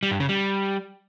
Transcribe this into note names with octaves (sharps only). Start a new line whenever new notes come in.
G3
G2
C#3
G3